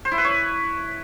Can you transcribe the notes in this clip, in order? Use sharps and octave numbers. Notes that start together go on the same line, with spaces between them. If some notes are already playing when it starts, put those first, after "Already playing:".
C5
E4
B4
C#5